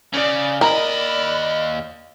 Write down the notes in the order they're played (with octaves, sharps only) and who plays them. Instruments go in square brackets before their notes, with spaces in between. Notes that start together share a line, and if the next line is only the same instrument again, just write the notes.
[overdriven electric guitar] C#3 [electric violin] D5
[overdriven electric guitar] D#2 D#5 [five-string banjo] A#4 [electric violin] D5 B5